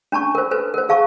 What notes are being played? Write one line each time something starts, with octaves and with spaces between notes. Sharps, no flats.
C#4 D4 A5 C#6
A#4 C5
A4 B4 C5
A#4 C5
G#4 F5 A5 C#6